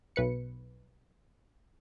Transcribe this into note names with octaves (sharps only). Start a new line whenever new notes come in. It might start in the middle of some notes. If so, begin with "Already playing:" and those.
B1 B4 C#7